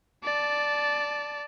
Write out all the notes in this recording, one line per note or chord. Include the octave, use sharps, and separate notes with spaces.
D5 A5